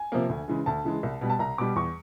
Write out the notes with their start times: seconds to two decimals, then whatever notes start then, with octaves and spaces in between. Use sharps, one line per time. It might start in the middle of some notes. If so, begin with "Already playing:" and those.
Already playing: G#5
0.12 C3 F3 A#3
0.29 D2
0.48 C#3 E3 G#3
0.66 D2 A5
0.84 C#3 E3 G#3
1.03 C2
1.21 B2 G3
1.30 A5
1.39 C2 A#5
1.58 B2 G3 D6
1.76 E2 C#6